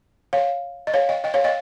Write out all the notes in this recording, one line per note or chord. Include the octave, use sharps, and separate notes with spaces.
C#5 F5
D#5
C#5 F5
D#5 G5
D#5 G5
C#5 F5
D#5 G5